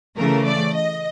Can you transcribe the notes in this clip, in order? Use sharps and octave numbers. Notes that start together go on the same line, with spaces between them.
C#3 E3 A3 A#4
D5
D#5